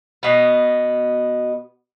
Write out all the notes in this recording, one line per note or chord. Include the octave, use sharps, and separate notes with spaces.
B2 B3